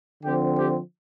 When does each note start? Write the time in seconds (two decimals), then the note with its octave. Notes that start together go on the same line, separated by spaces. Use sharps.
0.23 D3 F3 C4 G4
0.57 G4